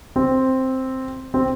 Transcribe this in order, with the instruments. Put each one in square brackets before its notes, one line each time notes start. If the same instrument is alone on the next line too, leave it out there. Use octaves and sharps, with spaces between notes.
[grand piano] C4
C4